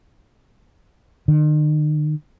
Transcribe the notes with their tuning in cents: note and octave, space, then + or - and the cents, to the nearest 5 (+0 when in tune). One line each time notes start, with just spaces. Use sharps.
D#3 -45